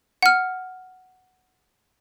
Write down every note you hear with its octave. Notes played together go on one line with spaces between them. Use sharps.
F#5 F6